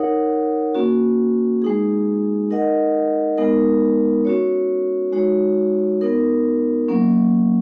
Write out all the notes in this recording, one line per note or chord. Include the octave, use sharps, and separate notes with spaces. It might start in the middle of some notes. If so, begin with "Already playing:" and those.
Already playing: D#4 A#4 C#5 F#5
A#3 C#4 F#4
G#3 D#4 G#4
D#4 A#4 D#5 F#5
G#3 B3 D#4 A#4
C#4 F#4 C#5
G#3 D#4 F#4 C#5
B3 D#4 A#4
F#3 A#3 C#4